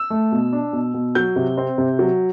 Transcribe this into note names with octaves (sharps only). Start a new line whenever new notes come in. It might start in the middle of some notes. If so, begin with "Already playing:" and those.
Already playing: E6
A3
B2
D4
B2
B2
F#3 G6
C3
C4
C3
F#3